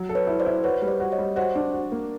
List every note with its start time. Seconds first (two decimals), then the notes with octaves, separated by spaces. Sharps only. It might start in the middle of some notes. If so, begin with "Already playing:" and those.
Already playing: F#3
0.09 A4
0.15 B4 C#5
0.27 E4
0.40 C5 D5
0.46 E4
0.64 F#4 B4 C#5
0.82 G3
0.88 C5 D5
1.00 F#4
1.12 C#5 D#5
1.18 G3
1.36 F#4 C5 D5
1.55 D4
1.72 F#4
1.92 A#3